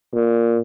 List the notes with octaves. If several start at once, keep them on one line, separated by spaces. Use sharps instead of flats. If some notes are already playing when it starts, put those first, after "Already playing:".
A#2